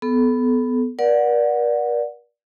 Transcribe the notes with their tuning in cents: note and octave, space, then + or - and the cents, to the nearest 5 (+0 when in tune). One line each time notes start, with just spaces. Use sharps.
B3 +10 A4 -25
A#4 +45 D5 +0 F#5 -15